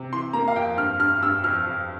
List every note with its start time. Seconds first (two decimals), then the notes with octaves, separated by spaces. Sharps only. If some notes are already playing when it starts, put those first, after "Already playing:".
Already playing: C3
0.13 E3 C6
0.33 A#3 A#5
0.48 F5
0.56 F2 G5
0.77 G2 F6
1.00 G2 F6
1.22 G2 E6
1.44 F2 F6
1.67 F2